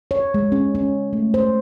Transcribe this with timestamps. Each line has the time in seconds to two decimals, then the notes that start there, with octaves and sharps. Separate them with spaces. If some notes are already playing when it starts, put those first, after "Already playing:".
0.11 C#5
0.34 G#3
0.52 C#4
0.75 C#4
1.13 A3
1.34 C5